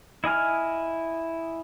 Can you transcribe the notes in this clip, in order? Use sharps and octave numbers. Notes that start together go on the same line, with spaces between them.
E4 D#5 G#5 F6